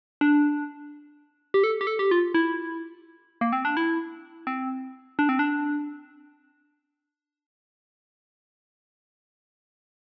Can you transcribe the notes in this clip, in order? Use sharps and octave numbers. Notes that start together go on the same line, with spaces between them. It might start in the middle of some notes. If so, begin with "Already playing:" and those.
D4
G4
A4
G4
A4
G4
F4
E4
A#3
C4
D4
E4
C4
D4
C4
D4